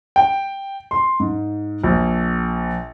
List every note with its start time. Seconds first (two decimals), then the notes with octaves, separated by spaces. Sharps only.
0.16 G5
0.91 C6
1.20 G#2
1.84 A#1